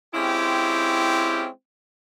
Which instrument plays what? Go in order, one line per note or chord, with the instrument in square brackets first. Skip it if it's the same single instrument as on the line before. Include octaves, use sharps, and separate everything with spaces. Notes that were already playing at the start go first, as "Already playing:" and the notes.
[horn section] G#3 C4 C#4 E4 F4 G4